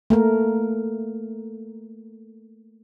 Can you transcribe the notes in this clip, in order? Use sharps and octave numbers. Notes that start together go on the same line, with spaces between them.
A3 A#3 A#4